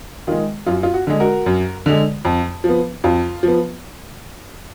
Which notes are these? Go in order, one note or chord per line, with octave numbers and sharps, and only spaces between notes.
D#3 G#3 F4
F#2 F4
F4
F#4
D3 G#3
F#4 A#4
F#2
D3 G#3
F2
F3 B3
F2 F4
F3 B3